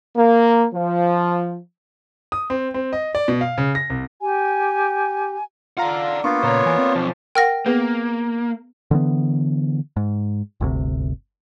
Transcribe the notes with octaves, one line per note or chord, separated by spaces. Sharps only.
A#3
F3
D#6
C4
C4
D#5
D5
B2
F5
C#3
A#6
C2
G4 G#5
F4 D5 F5 F#5 A#5
A#3 B3 D4 F4 C#6
A#2 C#3 C5 C#5 A#5
E3 G#5
C4
B1 F3 C5
A#4 F#5 G5 F6 A#6
A#3 B3 G#4 B4
D3 E3 B3
G#2
G1 D2 C3